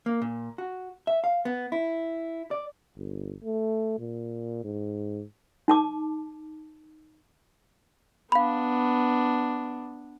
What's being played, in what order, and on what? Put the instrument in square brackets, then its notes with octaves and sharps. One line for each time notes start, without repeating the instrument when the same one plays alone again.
[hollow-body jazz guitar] A#3
A#2
F#4
E5
F5
B3
E4
D5
[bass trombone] G1
A3
A#2
G#2
[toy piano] D#4 A5 D6
[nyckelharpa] B3 D4 [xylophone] F5 B5